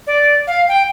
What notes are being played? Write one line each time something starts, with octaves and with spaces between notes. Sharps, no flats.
D5
F5
G5